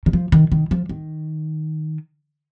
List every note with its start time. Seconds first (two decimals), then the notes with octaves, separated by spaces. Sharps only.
0.06 D#3
0.13 F3
0.32 D#3
0.52 D#3
0.71 F3
0.89 D#3